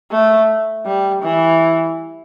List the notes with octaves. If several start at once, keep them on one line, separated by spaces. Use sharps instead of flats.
A3
G3
E3